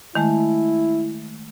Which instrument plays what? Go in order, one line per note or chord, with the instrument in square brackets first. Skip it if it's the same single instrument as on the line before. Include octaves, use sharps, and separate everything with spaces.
[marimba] D#3 G#3 A3 [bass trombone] E4